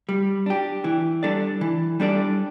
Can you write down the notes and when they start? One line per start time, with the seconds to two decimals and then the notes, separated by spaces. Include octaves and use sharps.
0.09 G3
0.46 D4 G4
0.84 E3
1.23 G3 D4 A4 D5
1.61 E3
2.00 G3 D4 A4 D5